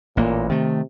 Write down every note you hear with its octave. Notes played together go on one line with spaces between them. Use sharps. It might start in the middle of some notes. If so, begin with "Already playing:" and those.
A1 A#2 A#3
C3 D#3 A3